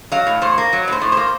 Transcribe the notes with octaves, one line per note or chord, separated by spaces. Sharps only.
F#3 F5
A2
A2 C5
A#3
F#3
A2 C5
A2
C5
A#3